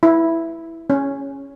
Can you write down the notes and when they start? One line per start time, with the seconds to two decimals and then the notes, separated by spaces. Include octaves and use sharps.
0.03 E4
0.90 C#4